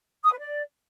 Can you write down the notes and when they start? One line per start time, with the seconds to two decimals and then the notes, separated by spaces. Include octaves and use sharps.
0.23 D#6
0.31 B4
0.39 D5